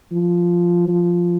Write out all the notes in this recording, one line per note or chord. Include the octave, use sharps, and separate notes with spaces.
F3
F3